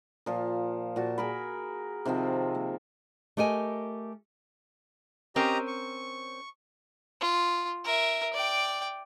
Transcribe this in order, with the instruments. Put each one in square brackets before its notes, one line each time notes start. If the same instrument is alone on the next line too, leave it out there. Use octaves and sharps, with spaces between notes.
[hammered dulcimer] A#2 F3
A#2 F#4 A5
G#4 A#4 B5
C3 D#3 F3 C4
A#3
[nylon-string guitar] A3 G4 A#4 D#5 G#5
[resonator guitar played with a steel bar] C4 C#4 A#4 [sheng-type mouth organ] G4 D#5 A#5
[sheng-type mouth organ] C#6
[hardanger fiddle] F4
A#4 E5
D5 G5